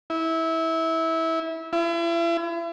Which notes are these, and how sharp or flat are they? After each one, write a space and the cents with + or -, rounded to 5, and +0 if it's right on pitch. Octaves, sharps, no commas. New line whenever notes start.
E4 -20
E4 +40